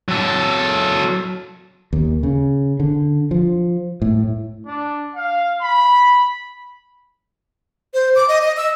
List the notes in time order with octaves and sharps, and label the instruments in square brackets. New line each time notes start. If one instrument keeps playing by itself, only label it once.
[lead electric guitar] F#3 A4
[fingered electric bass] D#2
C#3
D3
F3
A2
[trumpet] D4
F5
B5
[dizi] C5
D6
D#5
D#5
E6